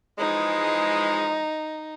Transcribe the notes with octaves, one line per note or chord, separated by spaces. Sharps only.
E3 F3 G#3 D#4